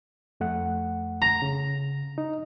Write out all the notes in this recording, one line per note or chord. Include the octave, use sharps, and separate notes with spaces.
F2 A3 F#5
A#5
C#3
D#4